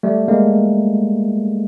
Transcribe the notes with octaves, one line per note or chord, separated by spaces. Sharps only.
G3 A3
G#3 A#3